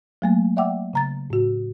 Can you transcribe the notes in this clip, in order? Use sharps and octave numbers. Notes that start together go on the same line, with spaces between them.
F#3 A3 A#3
D5 E5 F#5 G5 D6 E6
C#3 A#5 A6
A2 F#4